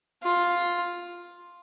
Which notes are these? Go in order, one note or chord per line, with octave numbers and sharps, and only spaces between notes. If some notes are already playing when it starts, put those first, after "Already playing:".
F4